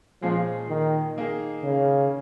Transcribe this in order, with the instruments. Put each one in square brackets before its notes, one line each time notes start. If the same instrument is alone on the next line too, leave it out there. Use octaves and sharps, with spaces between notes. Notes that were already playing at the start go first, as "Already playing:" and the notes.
[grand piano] A#2 G#3 C#4 G#4 [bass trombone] F3
[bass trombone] D#3
[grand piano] D#3 A#3 D#4 G#4
[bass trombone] C#3